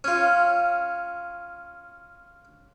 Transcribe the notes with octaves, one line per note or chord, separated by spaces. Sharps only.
C#4 F4